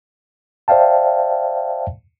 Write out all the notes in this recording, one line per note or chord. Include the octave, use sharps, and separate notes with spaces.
C5 D5 E5 F5 G5 A5